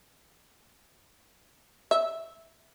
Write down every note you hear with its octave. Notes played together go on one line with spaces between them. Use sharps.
E5